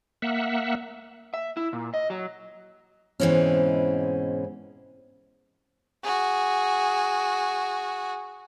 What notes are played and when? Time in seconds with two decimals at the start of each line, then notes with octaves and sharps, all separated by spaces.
0.22 A#3 E5 F#5
1.34 E5
1.57 E4
1.73 A#2
1.94 D#5
2.10 F#3
3.20 G#2 B2 E3 G#3 C4 C#4
6.03 F#4 G#4